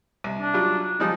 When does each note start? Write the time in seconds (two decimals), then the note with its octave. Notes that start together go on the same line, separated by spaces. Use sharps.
0.24 C2
0.41 D4
0.54 F#3 G3 F4
1.00 F3 G3 G#3 D#4